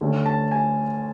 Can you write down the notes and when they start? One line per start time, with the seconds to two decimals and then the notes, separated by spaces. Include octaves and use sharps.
0.01 D2 D3 A3 C#4
0.26 A5
0.51 G#5